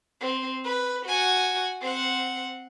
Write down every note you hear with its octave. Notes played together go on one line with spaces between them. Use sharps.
C4
B4
F#4 G#5
C4 F#5